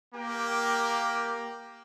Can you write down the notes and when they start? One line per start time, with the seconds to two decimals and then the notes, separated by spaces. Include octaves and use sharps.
0.14 A#3 G4 A#4 G5